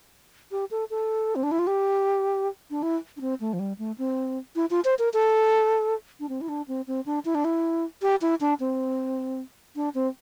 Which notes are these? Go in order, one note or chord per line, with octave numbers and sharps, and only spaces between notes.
G4
A4
A4
C4
D4
E4
F4
G4
D4
E4
D4
C4
A3
F3
G3
A3
C4
E4
F4
C5
A#4
A4
D4
C4
E4
D4
C4
C4
D4
E4
D4
E4
G4
E4
D4
C4
D4
C4